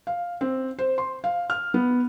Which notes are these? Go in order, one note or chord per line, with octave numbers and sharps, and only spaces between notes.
F5
C4
C5
C6
F5
F6
B3